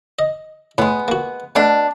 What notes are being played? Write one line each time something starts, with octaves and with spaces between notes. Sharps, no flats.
D#5
A2 G#3 B3
A#3 F#4
B2 A3 D4